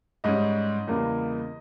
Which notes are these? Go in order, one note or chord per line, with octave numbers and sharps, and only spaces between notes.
G#2 G3 C#4 D#5
E2 C#3 G3 A#3